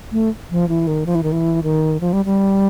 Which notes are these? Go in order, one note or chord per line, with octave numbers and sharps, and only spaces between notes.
A3
F3
E3
D#3
F3
E3
D#3
E3
D#3
F3
G3
G3